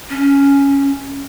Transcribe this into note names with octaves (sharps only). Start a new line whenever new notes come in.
C#4